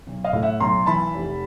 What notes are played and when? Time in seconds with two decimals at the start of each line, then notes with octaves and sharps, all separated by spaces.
0.07 B1
0.24 D#5 F5
0.33 A2
0.42 E5 F#5
0.60 B1 A#5 C6
0.86 E3 A5 B5
1.14 F1